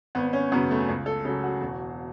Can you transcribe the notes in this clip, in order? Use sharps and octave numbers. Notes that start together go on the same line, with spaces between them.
G#1 B3
C#4
F#2 C#3 B3
A3
C#2
A4
C#3 F#3 A4
F#4
E1